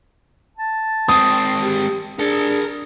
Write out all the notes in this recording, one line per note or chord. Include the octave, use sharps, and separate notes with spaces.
A5
G#3 C4 D#6
G4
D4 G#4 A#4 A5